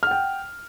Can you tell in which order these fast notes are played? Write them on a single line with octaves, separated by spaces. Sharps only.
F6 F#5 G5